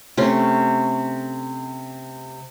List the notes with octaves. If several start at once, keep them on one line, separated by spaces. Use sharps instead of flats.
C3 A3 C#4 C6